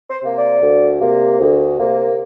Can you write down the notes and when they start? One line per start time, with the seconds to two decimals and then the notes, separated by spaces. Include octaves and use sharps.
0.10 C5
0.23 C3 A#3
0.37 D5
0.62 D2
1.01 C3 A#3
1.40 D2
1.79 C3 A#3